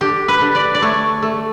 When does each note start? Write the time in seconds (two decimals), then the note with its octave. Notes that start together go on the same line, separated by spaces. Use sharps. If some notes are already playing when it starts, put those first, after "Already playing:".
0.01 D3 G4
0.28 B4
0.41 D3
0.55 D5
0.75 D5
0.82 A3 C#5
1.22 A3